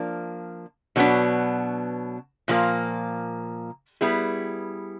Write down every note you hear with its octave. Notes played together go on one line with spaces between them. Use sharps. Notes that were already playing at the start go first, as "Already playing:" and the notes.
Already playing: F3 A#3 D4
B2 F#3 B3 D4
A#2 F3 A#3
G3 B3 E4 G#4